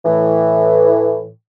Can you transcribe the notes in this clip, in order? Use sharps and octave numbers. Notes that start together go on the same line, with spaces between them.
A2 E3